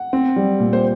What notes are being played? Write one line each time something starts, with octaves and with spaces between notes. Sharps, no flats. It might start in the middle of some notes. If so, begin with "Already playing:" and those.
Already playing: F#5
C4
G3
A#2
C5